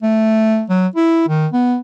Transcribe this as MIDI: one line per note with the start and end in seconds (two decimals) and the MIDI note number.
0.03 0.64 57
0.69 0.87 54
0.96 1.27 64
1.28 1.47 51
1.53 1.77 59